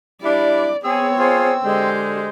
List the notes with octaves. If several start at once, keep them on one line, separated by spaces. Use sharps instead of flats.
G3 D4 E4 D5
B3 C4 G#4 C#5 E6
F4 G#4 C5
D3 G#3 G4 C5